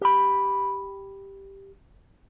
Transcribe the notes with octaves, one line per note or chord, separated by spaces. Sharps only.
G4 B5